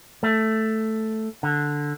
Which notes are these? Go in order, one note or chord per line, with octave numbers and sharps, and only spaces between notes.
A3
D3